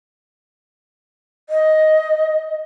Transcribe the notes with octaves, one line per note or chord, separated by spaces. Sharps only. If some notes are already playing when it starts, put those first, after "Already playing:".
D#5